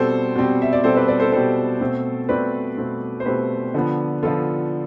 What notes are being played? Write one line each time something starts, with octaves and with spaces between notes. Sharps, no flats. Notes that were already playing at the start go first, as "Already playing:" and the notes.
Already playing: B2 G3 C4 A4 C5
B2 G3 C4
E5
D5
B2 G3 C4 A4 C5
B4 D5
B4 D5
A4 C5
B2 G3 C4 A4 C5
B2 A3 C4
B2 A3 C4 B4 D5
B2 A3 C4
C5
B2 A3 C4 G4 B4
D3 F3 B3
D3 F3 B3 F4 A4